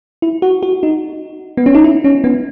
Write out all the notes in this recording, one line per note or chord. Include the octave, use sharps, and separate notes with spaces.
E4
F#4
F#4
D#4
B3
C#4
D#4
E4
C#4
B3